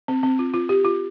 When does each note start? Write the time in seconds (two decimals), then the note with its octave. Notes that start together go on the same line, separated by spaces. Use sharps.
0.08 C4
0.23 C4
0.39 F4
0.54 F4
0.69 G4
0.84 F4